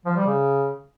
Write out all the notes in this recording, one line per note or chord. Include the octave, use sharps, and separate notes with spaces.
F3
G3
C#3